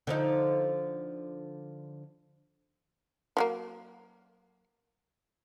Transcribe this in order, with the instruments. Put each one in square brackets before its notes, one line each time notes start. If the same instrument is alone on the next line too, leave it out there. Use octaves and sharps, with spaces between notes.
[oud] D3 F3 D#4
[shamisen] F3 F#3 A#3